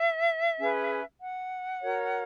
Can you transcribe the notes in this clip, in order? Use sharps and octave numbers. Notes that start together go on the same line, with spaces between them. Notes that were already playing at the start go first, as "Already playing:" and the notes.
Already playing: E5
C#4 G#4 B4
F#5
F#4 A#4 C#5